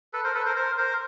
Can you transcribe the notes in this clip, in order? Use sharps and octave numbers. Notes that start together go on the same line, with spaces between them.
A4 B4
A#4 C5
A4 B4
A#4 C5
A#4 C5
A#4 C5